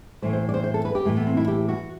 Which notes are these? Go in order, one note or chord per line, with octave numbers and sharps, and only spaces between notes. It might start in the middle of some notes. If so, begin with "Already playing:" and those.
A2 E3 C5
C5
D5
C5
C5
A4
B4
G4
A2 E3 A3
B3
C4
E4
G4
F#4